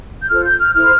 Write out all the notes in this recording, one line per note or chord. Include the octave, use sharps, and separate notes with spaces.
G6
F4 A4 C5 F6
G6
F6
E4 A4 C5 F6